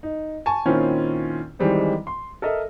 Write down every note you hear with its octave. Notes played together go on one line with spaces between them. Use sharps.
D#4
G#5 A5 C#6
A#2 D#3 C4 C#4 E4 F4
D#3 E3 G3 G#3 C4 D#4
C6
A4 A#4 D#5 E5